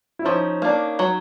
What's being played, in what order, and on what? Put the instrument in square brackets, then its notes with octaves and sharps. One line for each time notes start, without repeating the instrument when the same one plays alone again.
[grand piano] E4
[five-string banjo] F3 [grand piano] C#4 D#4
[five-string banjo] A#3 D4
F#3